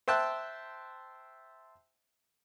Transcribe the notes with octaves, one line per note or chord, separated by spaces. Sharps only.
C5 E5 G5 A5 F#6